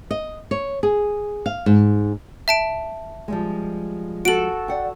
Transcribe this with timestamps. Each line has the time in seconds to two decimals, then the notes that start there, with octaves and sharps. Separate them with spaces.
0.11 D#5
0.51 C#5
0.83 G#4
1.46 F5
1.66 G#2
2.48 E5 A5 D7
3.28 F3 G3 G#3
4.25 F#4 A4 D7 F#7
4.68 D5 F#5 G5